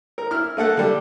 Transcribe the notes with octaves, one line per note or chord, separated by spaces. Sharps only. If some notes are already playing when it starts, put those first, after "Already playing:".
A#4
E4 F6
A3 A#3 A4 F#5
D3 G3